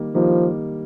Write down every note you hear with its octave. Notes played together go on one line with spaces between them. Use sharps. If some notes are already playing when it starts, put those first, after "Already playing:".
Already playing: D#3 G3 A#3 D#4
D#3 F3 G3 A#3 D#4